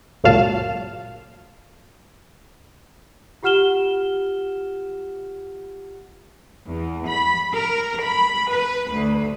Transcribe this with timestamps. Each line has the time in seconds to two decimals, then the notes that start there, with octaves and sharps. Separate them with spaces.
0.24 G1 C#2 A#2 F#3 F5 A5
3.43 F4 G4 F#5 F6 E7 G7
6.69 E2
7.06 B5
7.55 A#4
8.04 B5
8.51 B4
8.94 D2